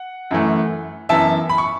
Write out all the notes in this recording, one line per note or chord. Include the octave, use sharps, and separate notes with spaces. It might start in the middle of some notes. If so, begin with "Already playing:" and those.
Already playing: F#5
F#2 E3 A3
F#2 E3 B3 E5 A5
B5
C#6